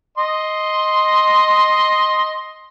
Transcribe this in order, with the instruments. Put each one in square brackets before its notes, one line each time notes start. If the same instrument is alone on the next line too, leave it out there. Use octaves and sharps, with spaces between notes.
[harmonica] D#5 C6